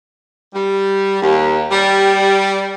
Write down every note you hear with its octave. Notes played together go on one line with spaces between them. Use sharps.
G3
D#2
G3